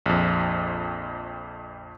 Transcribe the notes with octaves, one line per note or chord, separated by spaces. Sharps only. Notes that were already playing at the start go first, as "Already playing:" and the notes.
A#1 F2